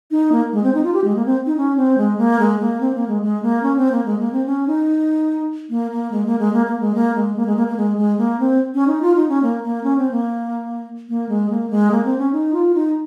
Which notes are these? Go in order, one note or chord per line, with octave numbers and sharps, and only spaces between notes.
D#4
A#3
G#3
C4
D#4
F4
G4
G#3
A#3
C4
D#4
C#4
C4
G#3
A#3
G#3
A#3
C4
A#3
G#3
G#3
A#3
C#4
C4
A#3
G#3
A#3
C4
C#4
D#4
A#3
A#3
G#3
A#3
G#3
A#3
A#3
G#3
A#3
G#3
A#3
G#3
A#3
A#3
G#3
G#3
A#3
C4
C#4
D#4
F4
D#4
C#4
A#3
A#3
C#4
C4
A#3
A#3
G#3
A#3
G#3
A#3
C4
C#4
D#4
F4
D#4